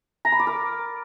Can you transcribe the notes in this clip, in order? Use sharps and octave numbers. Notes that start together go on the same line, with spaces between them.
A#5
B5
D5
A#4